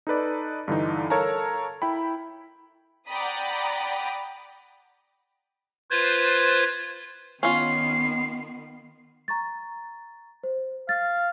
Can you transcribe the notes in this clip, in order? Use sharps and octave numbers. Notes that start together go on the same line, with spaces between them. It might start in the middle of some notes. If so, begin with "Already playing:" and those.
D#4 A4 B4 D5
G2 D3 E3 D#4
A4 A#4 C#5 F5 A5 A#5
E4 G5 B5
D5 F#5 G5 A#5 B5 D#6
F4 B4 C5 G#6
D#3 B3 C#4 F4 C7
A#5 C#6 A6
C5
F5 A6